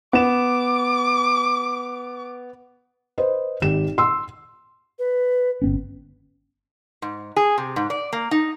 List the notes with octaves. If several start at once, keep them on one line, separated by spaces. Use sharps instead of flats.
B3 D6 E7
B4 C5 D#5
G#1 G4 E7
C6 E6
B4
G1 B3 C#4
G#2
G#4
C3
G#2
D5
A#3
D#4